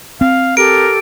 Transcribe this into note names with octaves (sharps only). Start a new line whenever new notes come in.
C4 F5
G4 A4 A#4 D7